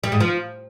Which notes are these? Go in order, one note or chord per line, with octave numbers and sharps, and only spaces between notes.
G3
G#2
F3